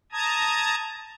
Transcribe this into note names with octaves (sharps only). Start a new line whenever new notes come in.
A5 A#5 D#6 G#6